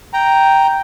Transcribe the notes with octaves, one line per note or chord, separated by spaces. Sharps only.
G5 A#5